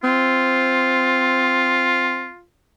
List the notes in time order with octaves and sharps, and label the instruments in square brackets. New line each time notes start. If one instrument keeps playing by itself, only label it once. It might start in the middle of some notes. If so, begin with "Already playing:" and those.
[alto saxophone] C4 [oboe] F4